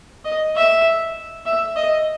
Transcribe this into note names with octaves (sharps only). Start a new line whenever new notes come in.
D#5
E5
E5
D#5